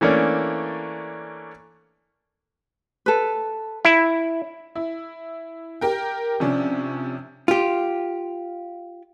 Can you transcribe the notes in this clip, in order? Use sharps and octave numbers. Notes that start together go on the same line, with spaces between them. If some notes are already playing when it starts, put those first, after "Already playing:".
E3 A3 A#3 C#4 D4
A4 B4
E4 B5
E4
G4 A#4 G5
C3 F3 C#4 D4
F4 G4